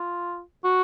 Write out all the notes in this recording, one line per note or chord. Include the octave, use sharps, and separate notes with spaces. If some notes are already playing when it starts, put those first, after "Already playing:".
Already playing: F4
F#4